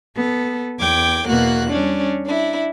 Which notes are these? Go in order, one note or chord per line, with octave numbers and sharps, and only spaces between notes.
B3 A4
E2 G5 D6 G#6
E2 B2 A#3 F#4 F#6
G3 C#4 D4
D4 E4